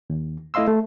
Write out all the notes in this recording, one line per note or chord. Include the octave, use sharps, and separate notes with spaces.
D#2
A3 E4 D#5 F5 C6 E6
A3